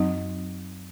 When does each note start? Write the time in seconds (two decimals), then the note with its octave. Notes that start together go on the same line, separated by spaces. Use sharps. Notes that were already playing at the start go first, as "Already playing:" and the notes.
Already playing: F#2 F#3 C4 D#4 D#5